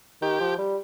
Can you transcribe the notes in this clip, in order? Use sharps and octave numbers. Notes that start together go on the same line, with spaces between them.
D#3 G4
F3
G3